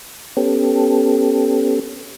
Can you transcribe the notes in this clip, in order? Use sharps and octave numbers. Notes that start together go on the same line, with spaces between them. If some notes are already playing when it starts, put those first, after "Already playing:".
B3 C#4 G4 A4